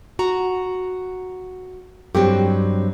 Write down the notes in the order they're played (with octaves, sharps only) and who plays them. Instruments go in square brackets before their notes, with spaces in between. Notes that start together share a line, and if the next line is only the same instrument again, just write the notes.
[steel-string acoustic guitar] F#4 F#5 A#5
[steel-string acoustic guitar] G2 F#3 C4 [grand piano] G4